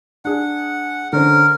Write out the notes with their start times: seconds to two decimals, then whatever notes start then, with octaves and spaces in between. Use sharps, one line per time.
0.25 D4 G#4 F#5
1.13 D3 C#4 A#4 C5